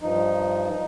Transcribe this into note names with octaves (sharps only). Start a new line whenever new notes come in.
G2 F3 D#4